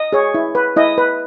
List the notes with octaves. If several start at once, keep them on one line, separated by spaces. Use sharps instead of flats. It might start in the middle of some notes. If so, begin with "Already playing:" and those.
Already playing: D#5
G#4 C#5
E4
B4
E4 D#5
B4